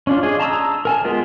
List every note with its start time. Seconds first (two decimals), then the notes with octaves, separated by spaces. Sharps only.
0.07 C#4 D4 F4
0.23 D4 G#4 D#5
0.40 A5 A#5 C6 D#6 E6
0.85 A#4 G#5 A5
1.04 G#3 B3 F4 G#4 A#4